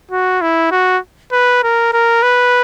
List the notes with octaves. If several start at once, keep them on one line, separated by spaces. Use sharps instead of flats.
F#4
E4
F#4
B4
A#4
A#4
B4